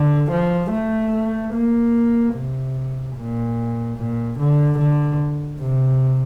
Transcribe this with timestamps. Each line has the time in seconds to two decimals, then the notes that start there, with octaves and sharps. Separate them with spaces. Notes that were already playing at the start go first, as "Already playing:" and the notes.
Already playing: D3
0.31 F3
0.71 A3
1.53 A#3
2.34 C3
3.16 A#2
3.97 A#2
4.39 D3
4.79 D3
5.61 C3